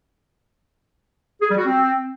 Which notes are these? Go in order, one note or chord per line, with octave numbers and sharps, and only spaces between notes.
G#4
G3
F#4
C4